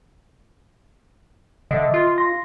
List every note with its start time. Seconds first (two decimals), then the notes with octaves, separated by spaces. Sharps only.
1.71 D3 D#5 E5
1.94 F4
2.18 C6 A#6